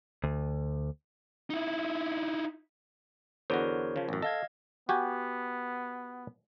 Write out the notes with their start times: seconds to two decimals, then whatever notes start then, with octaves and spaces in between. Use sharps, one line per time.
0.24 D2
1.50 D#4 E4
3.50 E2 D3 F#4 A#4 C5 C#5
3.96 C#3 F3
4.09 A1 F#2
4.22 A4 D#5 F5 G#6
4.89 B3 F#4 G4 G#5